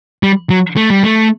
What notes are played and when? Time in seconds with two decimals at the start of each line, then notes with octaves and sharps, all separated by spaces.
0.23 G3
0.50 F#3
0.77 A3
0.90 G3
1.03 A3